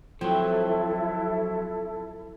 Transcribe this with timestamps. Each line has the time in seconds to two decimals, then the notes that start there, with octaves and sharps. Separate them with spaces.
0.21 F3 F#3 C4 E4 A4